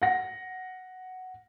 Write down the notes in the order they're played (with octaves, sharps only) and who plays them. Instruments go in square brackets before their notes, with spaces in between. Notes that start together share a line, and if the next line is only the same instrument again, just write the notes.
[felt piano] F#5 A#6